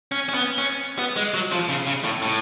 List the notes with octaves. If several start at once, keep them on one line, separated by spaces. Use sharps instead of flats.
C#4
C#4
B3
C#4
B3
G#3
F#3
F3
C#3
C#3
A2
A2